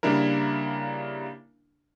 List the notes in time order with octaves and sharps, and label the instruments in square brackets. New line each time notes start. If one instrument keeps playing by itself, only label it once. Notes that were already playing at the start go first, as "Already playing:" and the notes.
[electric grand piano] C#3 G3 A#3 D4 E4 A#4